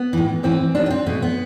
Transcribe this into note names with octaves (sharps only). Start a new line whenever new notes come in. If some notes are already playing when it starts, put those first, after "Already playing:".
Already playing: B3
A2 E3
A2 E3 C4
B2 D4
B3
C4
B2 A3
B3